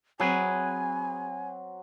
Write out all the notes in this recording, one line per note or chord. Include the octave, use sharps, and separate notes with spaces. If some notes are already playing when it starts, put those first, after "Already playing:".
F#3 C4 G#4 B4 G#5